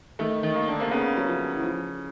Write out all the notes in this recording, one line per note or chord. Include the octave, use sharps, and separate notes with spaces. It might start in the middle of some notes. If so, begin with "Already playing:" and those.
D#3 A3
D#3
A#3
D3
C3 A#3
C#3 B3
F#3
F3
E3
F3